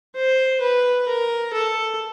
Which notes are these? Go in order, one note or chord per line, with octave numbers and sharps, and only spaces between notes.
C5
B4
A#4
A4